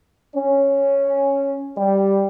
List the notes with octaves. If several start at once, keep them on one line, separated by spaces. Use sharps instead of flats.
C#4
G3 G4